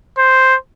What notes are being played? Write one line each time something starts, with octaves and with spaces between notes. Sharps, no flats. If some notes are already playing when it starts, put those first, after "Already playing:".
C5